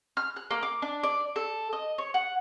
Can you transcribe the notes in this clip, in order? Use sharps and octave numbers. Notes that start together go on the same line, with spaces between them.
F6
F#6
A#3
D6
D4
D5
A4
D#5
C#5
F#5